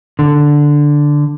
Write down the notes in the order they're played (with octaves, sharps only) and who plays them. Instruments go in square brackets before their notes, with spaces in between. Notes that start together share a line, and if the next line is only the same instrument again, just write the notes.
[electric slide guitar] D3